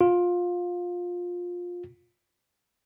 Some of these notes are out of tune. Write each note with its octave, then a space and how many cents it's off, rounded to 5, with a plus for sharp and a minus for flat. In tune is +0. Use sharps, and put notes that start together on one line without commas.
F4 +20